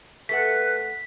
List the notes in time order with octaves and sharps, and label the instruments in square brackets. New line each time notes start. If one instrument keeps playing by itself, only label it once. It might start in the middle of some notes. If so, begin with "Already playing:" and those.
[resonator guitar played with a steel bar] A3 A4 F#5 [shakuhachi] B4 [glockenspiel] B6